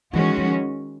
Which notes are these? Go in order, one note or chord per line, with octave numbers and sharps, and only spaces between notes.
D#3 E3 G#3 C#4 F#4
F3